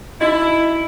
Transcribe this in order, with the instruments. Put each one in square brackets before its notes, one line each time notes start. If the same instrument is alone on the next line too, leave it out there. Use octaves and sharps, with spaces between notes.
[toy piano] D#4 F#4 D#5 [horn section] E4